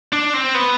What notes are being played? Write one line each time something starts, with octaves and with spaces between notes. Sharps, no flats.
D4
C4
B3